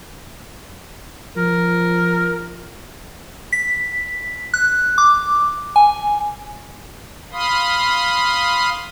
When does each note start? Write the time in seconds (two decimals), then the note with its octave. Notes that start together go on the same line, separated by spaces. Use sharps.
1.37 F3 A#4
3.53 B6
4.54 F#6
4.98 D6
5.76 G#5
7.32 F5 B5 C6 D#6